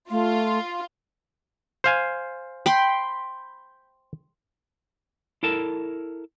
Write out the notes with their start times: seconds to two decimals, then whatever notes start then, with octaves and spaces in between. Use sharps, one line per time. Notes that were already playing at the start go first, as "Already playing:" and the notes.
0.11 A3 F4
1.84 C5 F5 G#5
2.66 G5 B5 C6
5.43 E4 A4 A#4 A5